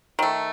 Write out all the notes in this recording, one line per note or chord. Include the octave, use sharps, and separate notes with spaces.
D#3 A3